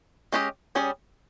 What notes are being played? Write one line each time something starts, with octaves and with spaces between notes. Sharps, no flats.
G#3 C#4 G4 B4 D#5
G3 C#4 G#4 C#5